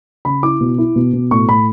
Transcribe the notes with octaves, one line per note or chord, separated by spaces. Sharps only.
C#3 B5
E4 D6
B2
E4
B2
B2
A2 C#6
A2 B5